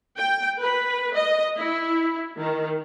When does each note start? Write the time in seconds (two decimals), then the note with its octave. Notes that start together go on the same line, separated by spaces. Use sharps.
0.18 G5
0.62 B4
1.13 D#5
1.59 E4
2.39 D#3